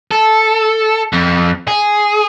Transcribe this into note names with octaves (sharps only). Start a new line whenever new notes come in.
A4
F2
G#4